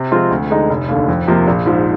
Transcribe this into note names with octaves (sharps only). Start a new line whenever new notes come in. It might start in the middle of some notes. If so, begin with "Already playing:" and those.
Already playing: C3
F3 G#3 C4 F4
D2
D3 G#3 D#4
F1
D#2 D3
F2
C3 F3 A#3 F4
A#1
G#2 F3